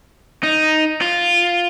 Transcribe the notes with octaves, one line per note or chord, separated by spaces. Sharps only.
D#4
F4